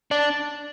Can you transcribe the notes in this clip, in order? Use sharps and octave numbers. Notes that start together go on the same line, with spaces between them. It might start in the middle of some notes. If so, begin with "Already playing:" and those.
D4